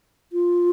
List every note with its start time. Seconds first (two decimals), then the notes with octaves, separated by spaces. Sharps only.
0.33 F4